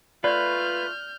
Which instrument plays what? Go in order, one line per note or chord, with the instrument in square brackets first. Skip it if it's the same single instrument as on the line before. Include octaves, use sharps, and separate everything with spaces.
[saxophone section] A3 F4 [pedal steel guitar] B4 [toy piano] D5 [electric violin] F6 G6